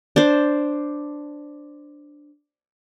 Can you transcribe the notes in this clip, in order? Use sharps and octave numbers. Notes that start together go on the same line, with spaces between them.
D4 C5